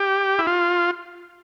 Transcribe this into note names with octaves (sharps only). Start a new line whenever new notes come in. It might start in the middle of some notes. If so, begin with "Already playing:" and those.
Already playing: G4
E4
F4